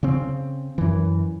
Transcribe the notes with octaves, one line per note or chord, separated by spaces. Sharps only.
C#3 C4
F#2 E3